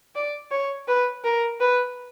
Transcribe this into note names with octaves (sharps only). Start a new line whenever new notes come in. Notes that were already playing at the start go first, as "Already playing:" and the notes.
D5
C#5
B4
A#4
B4